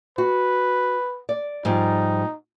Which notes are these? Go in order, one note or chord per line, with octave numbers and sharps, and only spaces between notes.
F#4 B4
D5
G#2 F3 G3 D#4